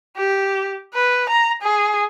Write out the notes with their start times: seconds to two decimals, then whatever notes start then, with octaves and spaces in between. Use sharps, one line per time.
0.17 G4
0.94 B4
1.29 A#5
1.62 G#4